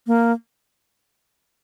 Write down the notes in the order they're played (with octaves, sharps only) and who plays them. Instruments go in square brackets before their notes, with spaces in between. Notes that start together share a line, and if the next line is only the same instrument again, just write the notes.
[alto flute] A#3